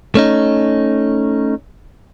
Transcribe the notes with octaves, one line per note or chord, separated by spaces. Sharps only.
A3 C#4 D#4